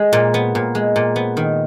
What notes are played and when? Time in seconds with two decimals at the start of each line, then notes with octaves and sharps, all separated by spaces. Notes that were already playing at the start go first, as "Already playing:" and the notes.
Already playing: G#3
0.13 A#2
0.34 B3
0.55 A#2
0.75 G#3
0.96 A#2
1.16 B3
1.37 D#3